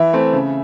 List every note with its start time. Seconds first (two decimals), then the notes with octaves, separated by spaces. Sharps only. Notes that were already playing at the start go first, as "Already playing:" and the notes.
Already playing: E3 E5
0.13 A3 C4
0.33 C#3